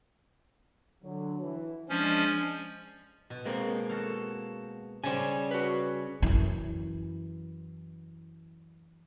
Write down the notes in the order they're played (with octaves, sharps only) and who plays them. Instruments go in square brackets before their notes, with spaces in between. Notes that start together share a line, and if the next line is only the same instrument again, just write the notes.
[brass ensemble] D3 F#3
E3
[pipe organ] F3 C#4 [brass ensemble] G#3 D4
[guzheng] B2
[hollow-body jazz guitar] G#3 A#3 C4
[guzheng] F#4 A4 F5
[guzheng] C#3 G3 [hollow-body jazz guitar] C5 G#5
[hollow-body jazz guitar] F#4 B4
[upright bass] F#2 E3